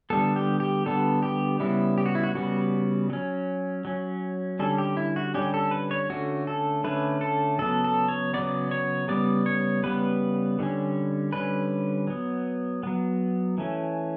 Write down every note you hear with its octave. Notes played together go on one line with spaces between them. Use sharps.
D3 G3 B3 A4
G4
G4
D3 G3 B3 A4
G4
C#3 G3 B3 E4
G4
F#4
E4
F#4
C#3 G3 B3 F#4
F#3 C#4
F#3 C#4
D3 G3 C#4 A4
G4
E4
F#4
D3 G3 C#4 G4
A4
B4
C#5
D3 A3 C#4 F#4
A4
D3 A3 C#4 B4
A4
C#3 F#3 B3 A4
A4
C#5
C#3 F#3 B3 D5
C#5
C#3 G3 B3 D5
C#5
C#3 G3 B3 B4
D3 G3 C#4
D3 G3 C#4 B4
F#3 B3
F#3 B3
E3 A3 C#4